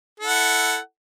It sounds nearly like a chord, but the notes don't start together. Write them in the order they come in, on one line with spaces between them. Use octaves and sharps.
A4 E4 F#5